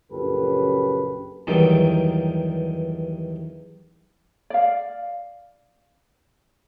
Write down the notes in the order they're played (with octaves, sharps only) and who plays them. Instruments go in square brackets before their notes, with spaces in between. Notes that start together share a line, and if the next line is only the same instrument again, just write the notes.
[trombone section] A#1 F#2 C#3 G4 A4 B4
[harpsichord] E2 G2 D#3 F#3 G4
[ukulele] D5 F5